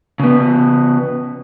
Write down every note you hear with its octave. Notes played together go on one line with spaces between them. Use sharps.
C#3 B3